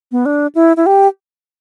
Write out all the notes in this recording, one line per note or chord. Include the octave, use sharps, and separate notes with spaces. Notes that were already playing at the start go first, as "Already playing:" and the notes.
B3
D4
E4
E4
G4